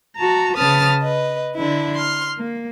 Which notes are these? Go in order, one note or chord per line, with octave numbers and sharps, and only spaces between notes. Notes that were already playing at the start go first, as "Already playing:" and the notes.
F#4 A5 A#5
C#3 B4 A5 D#6 F6 A6
B4 D#5
D3 D4 E4
C6 F6
A#3